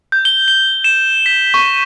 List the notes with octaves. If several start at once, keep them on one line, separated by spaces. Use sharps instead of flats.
G6
G7
G7
E7
B6
C#6